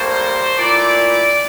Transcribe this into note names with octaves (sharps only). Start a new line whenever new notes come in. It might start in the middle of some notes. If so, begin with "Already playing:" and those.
Already playing: A2 G3 A#3 C5
A#2 A3 E4 D5